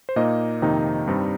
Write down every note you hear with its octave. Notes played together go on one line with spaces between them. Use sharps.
C5
A#2 A#3 D#4 D#5
F2 C3 D#3 A#3 D#4
G2 G3 C4 D#4